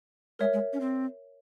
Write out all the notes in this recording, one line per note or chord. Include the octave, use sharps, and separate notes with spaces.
G#3 A#4 C#5 E5
G#3
C#4
C4